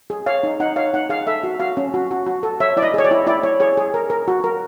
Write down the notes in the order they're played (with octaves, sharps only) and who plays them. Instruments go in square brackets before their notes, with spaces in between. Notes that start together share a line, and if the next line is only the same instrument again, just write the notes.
[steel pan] G#4
C#5 F5
D#4
D#4 F#5
C#5 F5
D#4 F#5
G#4 F5
A4 E5
F#4
F#4 F5
C#4
F#4
F#4
F#4
A4
C#5 E5
E4 D5
D#5
G#4 C#5
D5
E4
E4 D5
C#5
G#4 C#5
G#4
A#4
A#4
F#4
A#4